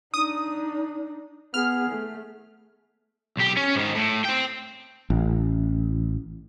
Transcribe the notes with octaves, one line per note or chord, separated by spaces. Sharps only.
D4 D#4 D#6
B3 G#4 F6
A3
B1 G4
C#4
G#2 D#3
A2
C4 G5
A1